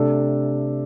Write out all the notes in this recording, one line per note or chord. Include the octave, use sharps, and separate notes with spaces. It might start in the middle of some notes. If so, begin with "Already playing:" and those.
Already playing: C3 A3 D4 A4